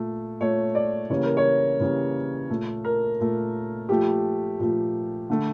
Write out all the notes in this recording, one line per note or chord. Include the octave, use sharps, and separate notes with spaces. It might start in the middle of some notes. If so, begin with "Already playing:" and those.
Already playing: A#2 A3
A#2 A3 C#5
D5
C#3 E3 G3 A#3 C#5
A#4
C#5
C#3 E3 G3 A#3
A#2 A3
A#4
A#2 A3
A#2 F3 A3 G4
A#2 F3 A3
D3 A3